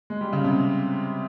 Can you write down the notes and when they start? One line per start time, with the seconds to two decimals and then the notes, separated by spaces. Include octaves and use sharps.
0.10 G#3
0.21 G3
0.33 C#3
0.44 C3